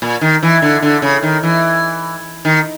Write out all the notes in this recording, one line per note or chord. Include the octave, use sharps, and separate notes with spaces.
A#2
D#3
E3
D3
D3
C#3
D#3
E3
D#3